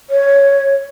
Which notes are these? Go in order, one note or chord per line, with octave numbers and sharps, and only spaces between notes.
C#5